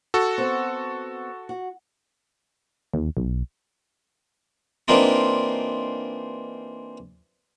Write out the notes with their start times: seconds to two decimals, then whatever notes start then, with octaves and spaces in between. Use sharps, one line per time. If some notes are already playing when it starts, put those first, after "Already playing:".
0.14 F#4 A4
0.38 B3 C4
1.49 F#4
2.94 D#2
3.17 B1
4.88 E3 A#3 C4 D4 D#4 F4